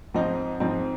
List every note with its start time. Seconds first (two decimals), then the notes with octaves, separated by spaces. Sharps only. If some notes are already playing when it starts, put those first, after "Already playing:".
0.14 G#2 F3 C4 D#4
0.60 G#2 F3 C4 D#4